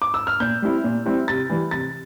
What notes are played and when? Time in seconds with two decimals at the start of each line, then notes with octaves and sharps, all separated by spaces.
0.02 D6
0.14 E6
0.27 F6
0.40 A#2 G6
0.62 G3 C4 E4
0.84 A#2
1.06 G3 C4 E4
1.28 C3 A6
1.50 E3 G3
1.71 C3 A6